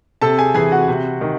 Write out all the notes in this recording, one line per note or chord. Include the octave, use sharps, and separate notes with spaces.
C3 A4 A5
G#4 G#5
E3 G#4 G#5
F#4 F#5
C3
D#3